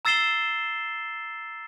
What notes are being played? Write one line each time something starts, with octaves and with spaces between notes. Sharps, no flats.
A#5 E6 A6 C7 E7 G7